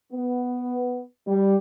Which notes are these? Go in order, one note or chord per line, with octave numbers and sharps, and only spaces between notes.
B3
G3